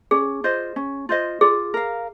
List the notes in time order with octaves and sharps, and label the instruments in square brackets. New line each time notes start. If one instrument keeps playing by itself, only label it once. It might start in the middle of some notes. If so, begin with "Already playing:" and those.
[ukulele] C#4 [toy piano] G#4
[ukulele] F4 C5 D#5
C#4
F4 C5 D#5
[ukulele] F4 [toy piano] G#4
[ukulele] A#4 F5